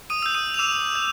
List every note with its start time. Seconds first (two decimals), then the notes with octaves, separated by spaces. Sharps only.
0.10 D#6 D#7
0.22 E6 G6
0.34 D#6 D#7
0.54 F7
0.59 D6 E6 E7
0.95 G6